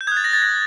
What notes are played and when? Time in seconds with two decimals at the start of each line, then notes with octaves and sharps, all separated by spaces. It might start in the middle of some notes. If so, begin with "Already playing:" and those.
0.01 G6
0.07 D#6 F#6 G#6
0.17 A6
0.24 A#6
0.33 A6
0.42 A#6